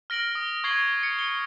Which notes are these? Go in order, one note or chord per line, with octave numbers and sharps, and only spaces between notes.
F6 A#6 D7 F#7 G7
D#6
C#6 G#6 C7 F#7
C#7
C#7 G7